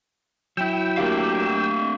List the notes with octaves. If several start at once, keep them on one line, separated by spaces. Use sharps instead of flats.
F#3 E4 G5 E6
A3 A#3 D4 G4 F5